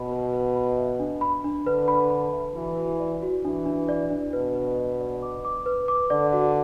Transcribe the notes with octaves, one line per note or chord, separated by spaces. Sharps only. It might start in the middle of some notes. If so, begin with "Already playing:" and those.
Already playing: B2 B4 B5
B4
B4
B5
E5
D4
B5
D4
D3 B4
B5
B5
E5
E3 F#4
F#4
D5
F#4
E3 D4
D4
D5
D4
B2 B4
B4
D5
D5
D6
D6
B4
D6
D3 D5
F#4